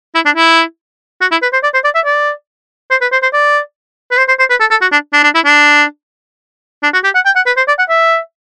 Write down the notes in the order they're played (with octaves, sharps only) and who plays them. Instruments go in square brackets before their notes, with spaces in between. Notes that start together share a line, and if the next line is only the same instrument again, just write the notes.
[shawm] E4
D4
E4
F#4
E4
B4
C5
D5
C5
D5
E5
D5
C5
B4
C5
C5
D5
B4
C5
C5
C5
B4
A4
A4
F#4
D4
D4
D4
E4
D4
D4
F#4
G4
F#5
G5
F#5
B4
C5
D5
F#5
E5